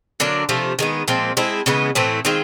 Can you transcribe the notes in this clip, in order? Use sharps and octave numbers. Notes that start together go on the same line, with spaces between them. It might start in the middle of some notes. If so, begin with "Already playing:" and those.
D3 F#3 A#3 D4
C3 F3 A3
D#3 G#3 B3
A#2 F3 G#3 C4
G#3 C4 E4 A4
C#3 E3 G#3 B3
A2 E3 A3 C4
D#3 G#3 C4 F4